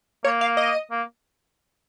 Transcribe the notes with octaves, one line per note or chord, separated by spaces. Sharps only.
A#3 C#5
F5
D#5
A#3